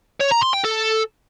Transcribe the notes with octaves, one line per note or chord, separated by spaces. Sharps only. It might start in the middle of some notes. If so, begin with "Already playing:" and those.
C#5
A#5
C6
G5
A4